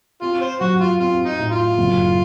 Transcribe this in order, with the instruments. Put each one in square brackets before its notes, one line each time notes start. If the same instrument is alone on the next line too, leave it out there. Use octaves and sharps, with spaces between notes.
[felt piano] C4 [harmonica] F4
[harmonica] C5
[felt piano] F#3 [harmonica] F#4
[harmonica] F4
[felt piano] C4 [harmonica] F4
[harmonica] D#4
[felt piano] A2
[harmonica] F4
[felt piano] F#1